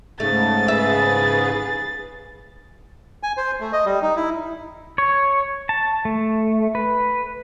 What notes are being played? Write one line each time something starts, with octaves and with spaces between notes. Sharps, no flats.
G#2 C#3 A3 A6
G#4 B4 E5
G#5
C5
A3
D#5
G3
D#4
E4
C#5
A5
A3
B4